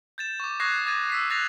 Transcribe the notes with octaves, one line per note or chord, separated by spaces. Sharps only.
G6 A6 E7
C#6 D6
C#6 D#6 F#6 G#6 A#6 C7
D6 D#6 G#6 A6 D#7
E6 B6 C7
F#6 A6 A#6 C7 F7